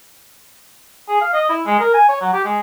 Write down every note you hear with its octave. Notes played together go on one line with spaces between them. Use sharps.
G#4
F5
D#5
E4
G#3
A#4
G#5
C#5
F#3
G4
G#3